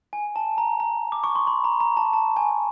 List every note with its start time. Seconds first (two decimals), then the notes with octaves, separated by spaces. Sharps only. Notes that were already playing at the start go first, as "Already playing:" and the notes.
0.13 G#5
0.36 A5
0.58 A#5
0.80 A#5
1.12 D6
1.24 C#6
1.35 C6
1.47 B5
1.64 A#5
1.80 A#5
1.97 A5
2.13 A5
2.37 G#5